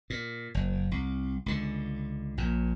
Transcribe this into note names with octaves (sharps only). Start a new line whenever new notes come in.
A#2
F#1
C2
C#2 D3
A#1 A#2